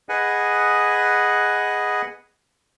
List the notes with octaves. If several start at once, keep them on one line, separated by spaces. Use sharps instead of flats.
G#4 B4 D#5 F#5 G#5